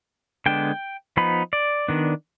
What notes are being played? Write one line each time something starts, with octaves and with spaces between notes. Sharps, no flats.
D3 G#3 B3 D4 G5
F3 B3 D#4 B5
D5
D#3 B3 D4